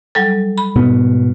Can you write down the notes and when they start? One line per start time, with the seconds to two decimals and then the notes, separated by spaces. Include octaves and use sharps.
0.15 F#3 G3 A4
0.58 B5
0.76 G#2 B2 B3